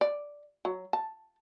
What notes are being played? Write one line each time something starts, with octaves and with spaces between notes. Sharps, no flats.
D5
F#3
A5